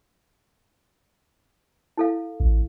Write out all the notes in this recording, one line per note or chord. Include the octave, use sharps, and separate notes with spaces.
E4 A4 F5
A1